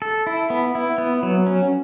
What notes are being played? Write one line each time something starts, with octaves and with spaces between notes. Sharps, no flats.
A4
E4
B3
E4
B3
F#3
C#4